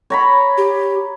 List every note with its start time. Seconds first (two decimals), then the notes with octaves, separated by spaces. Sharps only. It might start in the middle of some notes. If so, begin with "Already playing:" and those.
0.10 C#5 A#5 B5
0.58 G4